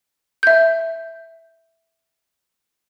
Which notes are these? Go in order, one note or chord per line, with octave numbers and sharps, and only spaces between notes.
E5 G6